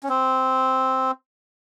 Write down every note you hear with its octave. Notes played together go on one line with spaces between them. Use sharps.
C#4
C4